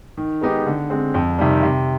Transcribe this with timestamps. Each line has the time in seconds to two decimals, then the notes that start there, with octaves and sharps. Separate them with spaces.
0.18 D#3
0.41 G#3 B3 D#4 G4
0.66 D3
0.90 G#3 C4
1.14 F2
1.39 C3 D#3 G3
1.63 C3